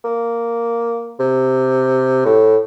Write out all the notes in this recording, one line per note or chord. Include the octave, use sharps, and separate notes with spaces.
A#3
C3
A2